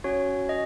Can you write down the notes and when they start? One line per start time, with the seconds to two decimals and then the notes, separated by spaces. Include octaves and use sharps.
0.04 C#4 F#4 C#5
0.49 D#5